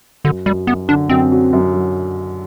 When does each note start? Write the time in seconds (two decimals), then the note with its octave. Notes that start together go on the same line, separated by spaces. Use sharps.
0.24 F#2 D3
0.46 F#2 G3
0.67 F#2 B3
0.88 D3 D4
1.09 F#2 C4
1.32 F#3
1.53 F#2
1.74 F#3